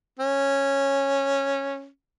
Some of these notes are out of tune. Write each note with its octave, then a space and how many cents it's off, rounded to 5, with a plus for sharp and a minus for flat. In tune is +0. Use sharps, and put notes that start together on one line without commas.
C#4 -10